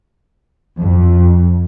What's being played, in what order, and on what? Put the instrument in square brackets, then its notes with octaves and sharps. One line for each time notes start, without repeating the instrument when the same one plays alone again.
[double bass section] F2